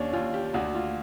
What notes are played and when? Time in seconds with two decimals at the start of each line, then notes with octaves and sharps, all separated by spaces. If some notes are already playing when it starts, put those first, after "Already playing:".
Already playing: D#2 C#4 D4
0.13 D#2 F4
0.34 G4
0.54 D2 F#4
0.74 F4